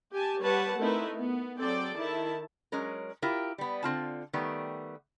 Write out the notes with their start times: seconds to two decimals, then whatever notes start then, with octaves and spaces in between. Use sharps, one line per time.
0.12 G4 G#5 A5
0.41 G3 B4 C#5 F#5 A5
0.79 A3 C4 D#4 E4 A#4 B4
1.14 B3
1.58 F#3 C4 G#4 A4 D5 G5
1.96 D#3 E4 A5
2.72 F#3 G#3 C#4 A#4
3.22 E4 F4 G4 A#4
3.58 G3 B3
3.83 D3 C4 F4 A5
4.33 D#3 G3 A3 B3